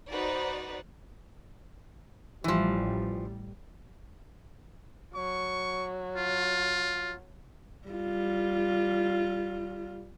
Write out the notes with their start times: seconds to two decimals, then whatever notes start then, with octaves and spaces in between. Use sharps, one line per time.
0.11 D#4 F#4 B4 C5 D5
2.44 A1 E3 F3 G3
5.15 F#3 C#6
6.16 F4
7.88 G3 F4